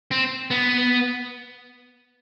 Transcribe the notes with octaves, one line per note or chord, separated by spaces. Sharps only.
C4
B3